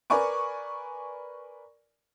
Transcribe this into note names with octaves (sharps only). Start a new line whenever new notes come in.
A#4 B4 D5 G#5 C#6 D6